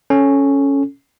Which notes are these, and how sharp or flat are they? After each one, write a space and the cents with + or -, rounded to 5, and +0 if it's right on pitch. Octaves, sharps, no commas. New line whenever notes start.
C#4 +0 A4 -15